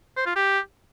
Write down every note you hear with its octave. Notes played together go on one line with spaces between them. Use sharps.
C5
F4
G4